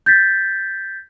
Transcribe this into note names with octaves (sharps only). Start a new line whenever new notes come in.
G6 A6 B6